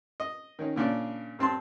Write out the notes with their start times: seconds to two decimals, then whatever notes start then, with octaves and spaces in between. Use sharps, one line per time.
0.20 D#5
0.59 D#3 C#4 D#4
0.76 A#2 C#3 D4 D5
1.39 G2 C4 A5 C6